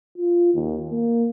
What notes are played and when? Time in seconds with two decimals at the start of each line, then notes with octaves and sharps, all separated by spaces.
0.18 F4
0.54 D#2
0.90 A#3